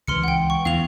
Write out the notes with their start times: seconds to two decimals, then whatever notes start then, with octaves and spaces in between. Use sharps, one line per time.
0.07 C#2 E3 C6 F6 C#7
0.24 F#5 G5
0.50 C#6
0.65 E2 F5 F7